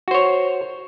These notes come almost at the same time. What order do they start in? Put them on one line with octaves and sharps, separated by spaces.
F#4 C5 C#5